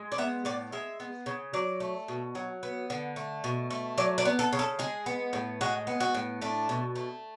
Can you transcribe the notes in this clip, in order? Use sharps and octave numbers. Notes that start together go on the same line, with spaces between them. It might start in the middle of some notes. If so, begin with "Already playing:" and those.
Already playing: G#3
D5
B3 E5
A2 D5
G#3 E5
B3
C#3
F#3 D5
A3
B2
F#3
B3
D3
A3
B2
A3
F#3 D5
D5
B3
A4
C#3
A4
G#3 G#4
B3
A2
G#3 F#4
B3
F#4
A2
A3 D4
B2
A3